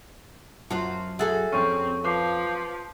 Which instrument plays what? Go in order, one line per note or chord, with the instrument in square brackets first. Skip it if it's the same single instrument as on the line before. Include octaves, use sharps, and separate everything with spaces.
[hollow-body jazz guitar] F#2 [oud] F4 F#4 C5 [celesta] A5 C6
[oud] F#4 G#4 A4 [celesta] E5 E6 A6
[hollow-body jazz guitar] F2 C#4 [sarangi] C4 [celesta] C#6
[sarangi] F3 [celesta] B4 D6 C7